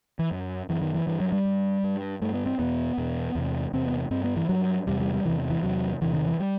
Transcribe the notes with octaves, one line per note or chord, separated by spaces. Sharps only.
E3
F#2
F#2 E3
D#3
E3
G2 E3
F#3
G3
G2
G2
G2 A3
B3
C4
E2 B2 B3
E2 B2
E2 C3
E2 C3 C4
B3
G2 C4
B3
E3
G2 F#3
E2 C3 G3
G3
G3
E2 C3 E3
E3
E2 C3 F#3
E2 C3 E3
D#3
E3
G3